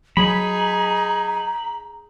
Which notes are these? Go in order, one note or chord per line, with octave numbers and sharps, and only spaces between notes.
F#3 D#4 G#4 A#5 B5